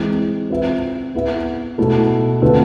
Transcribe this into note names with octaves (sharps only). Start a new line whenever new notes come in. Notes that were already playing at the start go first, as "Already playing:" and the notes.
Already playing: E3 G#3 C4
C4 F4 B4 E5
B3 E4 B4 E5
B2 A3 E4 A4
D3 A3 C4 F4 B4